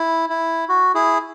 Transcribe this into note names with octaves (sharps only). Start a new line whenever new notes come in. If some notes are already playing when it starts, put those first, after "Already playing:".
Already playing: E4
E4
F#4
E4 G#4